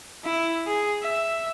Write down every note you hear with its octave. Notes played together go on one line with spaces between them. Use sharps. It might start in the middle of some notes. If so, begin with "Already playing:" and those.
E4
G#4
E5